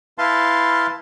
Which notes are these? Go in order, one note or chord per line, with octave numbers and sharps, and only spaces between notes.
E4 B4 F5 A5 C6